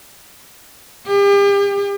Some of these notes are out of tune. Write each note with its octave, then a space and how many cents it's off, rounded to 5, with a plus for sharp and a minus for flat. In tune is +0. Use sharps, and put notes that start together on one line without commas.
G4 +40